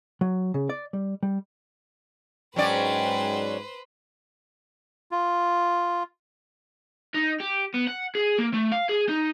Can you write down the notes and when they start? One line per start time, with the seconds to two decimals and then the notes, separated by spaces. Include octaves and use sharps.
0.21 F#3
0.54 C#3
0.70 D5
0.93 G3
1.23 G3
2.56 G#2 F#3 C#4 B4 C5 D5 G5
5.11 F4
7.14 D#4
7.40 G4
7.74 B3
7.87 F#5
8.15 G#4
8.39 A#3
8.54 A3
8.72 F5
8.89 G#4
9.09 D#4